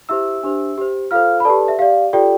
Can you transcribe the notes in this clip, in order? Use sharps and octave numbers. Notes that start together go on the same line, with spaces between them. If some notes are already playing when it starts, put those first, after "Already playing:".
E4 G4 C5 E5 E6
D4 G4 C5
G4 C5
F4 A4 C5 F5 F6
B5
G4 A4 B4 D5 A5
E5
G4 D5 F5
F4 G4 A4 D5 G5